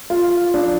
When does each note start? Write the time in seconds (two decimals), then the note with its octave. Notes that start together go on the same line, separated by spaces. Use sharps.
0.10 F4
0.54 D4